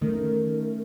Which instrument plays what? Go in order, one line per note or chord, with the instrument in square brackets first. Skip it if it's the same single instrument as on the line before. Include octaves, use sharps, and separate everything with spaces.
[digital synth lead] D#3 [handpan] A3 C#4 [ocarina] A#4